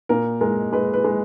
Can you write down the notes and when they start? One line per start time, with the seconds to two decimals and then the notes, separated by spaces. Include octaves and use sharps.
0.09 A#2 A#4
0.41 G#3 A#4
0.72 G#3 B4
0.94 B4
1.04 G#3